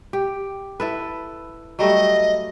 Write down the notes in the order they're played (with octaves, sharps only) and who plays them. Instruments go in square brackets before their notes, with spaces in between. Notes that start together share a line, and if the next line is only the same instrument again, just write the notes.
[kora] G4
E4 A4 B4
[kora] F#3 G3 A3 [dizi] D#5